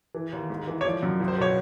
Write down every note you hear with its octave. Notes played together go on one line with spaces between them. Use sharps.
E3
D#2
G#2
E3
C#5
F3 D5
F#2
C#2
C5
B2 C#5